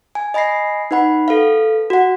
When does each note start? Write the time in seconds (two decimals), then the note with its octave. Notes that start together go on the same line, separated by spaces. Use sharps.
0.15 G#5
0.34 D#5 G#5 B5 A#6 C7
0.91 D#4 B4 F#5 B5
1.28 A4 B4 F5
1.90 F#4 F#5